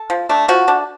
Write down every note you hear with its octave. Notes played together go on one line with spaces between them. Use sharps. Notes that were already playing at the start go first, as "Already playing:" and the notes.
Already playing: A4
F3
A3 D4
F3 F#4
A3 D4